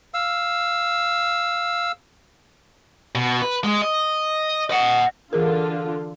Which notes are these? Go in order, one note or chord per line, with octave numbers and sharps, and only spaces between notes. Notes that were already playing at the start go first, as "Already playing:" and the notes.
F5 E6
B2
B4
G#3
D#5
D#5 F#5
D3 E3 F4 G#4 A#4